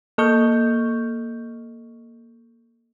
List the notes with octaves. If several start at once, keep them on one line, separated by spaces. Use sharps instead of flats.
A#3 A4 D#5 C#6 F6 G6